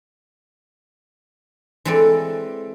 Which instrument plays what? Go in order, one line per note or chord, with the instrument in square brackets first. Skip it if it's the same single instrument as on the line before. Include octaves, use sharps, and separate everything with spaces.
[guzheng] E3 G#3 C4 A4 D5